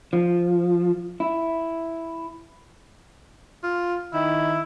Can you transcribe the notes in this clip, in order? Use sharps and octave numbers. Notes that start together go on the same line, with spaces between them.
F3
E4
F4
D#3 E4